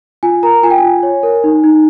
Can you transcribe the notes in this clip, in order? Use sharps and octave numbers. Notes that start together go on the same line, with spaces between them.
F4 G#5
A#4 A#5
F4 G#5
G5
G#5
F4
C#5
A#4
D#4
D#4